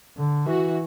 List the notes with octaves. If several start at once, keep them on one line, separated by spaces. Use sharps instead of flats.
D3
E3 F#4